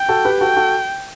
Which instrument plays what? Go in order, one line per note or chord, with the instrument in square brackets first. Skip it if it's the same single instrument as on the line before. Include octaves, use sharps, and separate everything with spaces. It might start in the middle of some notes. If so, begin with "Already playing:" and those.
Already playing: [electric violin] G5
[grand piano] F#4 A4
G4 B4
[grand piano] F#4 A4 [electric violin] G5
[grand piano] F#4 A4